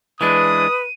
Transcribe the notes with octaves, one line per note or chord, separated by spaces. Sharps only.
E3 G#3 D4 B4 D#6 D#7